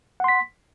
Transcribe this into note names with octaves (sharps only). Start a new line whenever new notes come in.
F#5 C6 B6